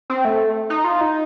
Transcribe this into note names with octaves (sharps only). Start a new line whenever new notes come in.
C4
A3
D#4
F4
D#4